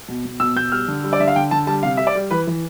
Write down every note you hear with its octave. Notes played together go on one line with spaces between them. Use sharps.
B2
B2
B2 E6
B2 G6
G3 F6
D3
G3
D5
D3 E5
F5
D3 G5
D3 A5
G3 A5
C3 F5
G3 E5
D5
G3
E3 B4
E3